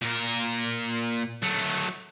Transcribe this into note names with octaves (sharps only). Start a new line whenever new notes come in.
A#2 A#4
F#3 A3